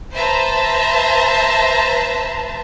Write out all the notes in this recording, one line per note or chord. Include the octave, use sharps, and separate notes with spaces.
B4 C5 E5 A5 A#5